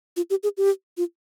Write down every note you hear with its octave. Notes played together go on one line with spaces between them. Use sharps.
F4
G4
G#4
G4
F4